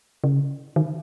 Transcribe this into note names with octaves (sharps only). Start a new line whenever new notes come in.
C#3
D#3